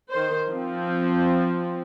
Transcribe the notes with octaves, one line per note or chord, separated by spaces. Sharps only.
D#3 C5
F3 C4